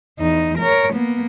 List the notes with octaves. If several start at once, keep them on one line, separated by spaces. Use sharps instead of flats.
E2 D#4
A#4 C#5
A#3 B3